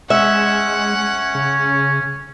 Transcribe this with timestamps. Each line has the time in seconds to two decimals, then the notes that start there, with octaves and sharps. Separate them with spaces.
0.10 G#3 C#4 E5 F#5
1.35 C#3